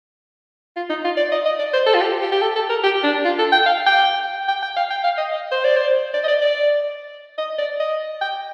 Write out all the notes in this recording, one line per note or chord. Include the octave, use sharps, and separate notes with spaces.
F4
D#4
F4
D5
D#5
D#5
D5
C5
A4
F4
G4
G4
G4
A4
A4
A#4
G4
D4
F4
A4
G5
F5
G5
G5
G5
F5
G5
F5
D#5
D#5
C5
D5
C5
D5
D#5
D5
D5
D#5
D5
D#5
G5